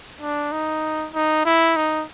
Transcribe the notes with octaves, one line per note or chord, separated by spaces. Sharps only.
D4
D#4
D#4
E4
D#4